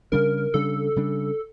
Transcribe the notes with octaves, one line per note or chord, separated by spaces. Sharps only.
C#3 G3 D4 A#4
C#3 G3 D4 A4
C#3 G3 D4